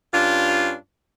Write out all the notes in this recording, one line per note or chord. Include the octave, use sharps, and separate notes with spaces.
G2 C#4 D4 F4